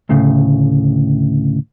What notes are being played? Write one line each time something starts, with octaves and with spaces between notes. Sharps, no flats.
D2 A2 C#3